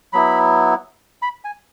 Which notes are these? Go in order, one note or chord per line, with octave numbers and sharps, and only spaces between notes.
F#3 B3 E4 B5
B5
G#5